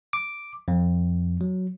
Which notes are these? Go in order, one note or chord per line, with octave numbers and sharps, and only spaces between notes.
D6
F2
F#3